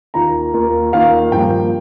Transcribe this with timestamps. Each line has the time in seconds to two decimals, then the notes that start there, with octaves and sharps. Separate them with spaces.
0.14 D#2 D#3 A#3 F4 A#5
0.53 D#2 D#3 A#3 F4
0.92 D#2 D#3 A#3 F4 F5
1.31 G2 F3 A#3 G5